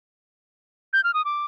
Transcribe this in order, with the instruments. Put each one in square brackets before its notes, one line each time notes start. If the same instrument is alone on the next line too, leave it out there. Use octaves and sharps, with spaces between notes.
[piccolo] G6
F6
D#6
D6